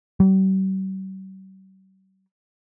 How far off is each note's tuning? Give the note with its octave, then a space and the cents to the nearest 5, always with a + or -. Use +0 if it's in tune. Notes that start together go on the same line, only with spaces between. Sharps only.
G3 -45